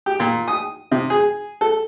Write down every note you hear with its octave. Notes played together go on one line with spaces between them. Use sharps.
G4
A#2
D#6
C3
G#4
A4